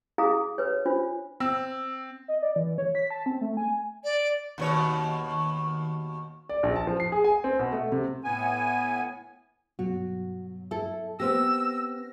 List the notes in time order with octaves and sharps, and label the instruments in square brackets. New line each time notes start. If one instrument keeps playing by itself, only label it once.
[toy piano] E4 G#4 F5 A#5 D#6
B4 C#5
D4 F4 C5
[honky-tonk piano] C4 E6
[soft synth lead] D#5
D5
E3
C#5
B6
A5
C4
A3
G#5
[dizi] D5
[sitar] D#2 B2 C#5
[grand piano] D5
A#1
A5
F3
C7
G#4
G#5
C4
B2
A3
C3
[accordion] A2 B3 G#5
[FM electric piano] G2 B2 F#3 [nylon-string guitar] F#4
[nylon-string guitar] E4 A4
[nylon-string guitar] B3 C4 G4 [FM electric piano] C5 F6 A#6 [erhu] E6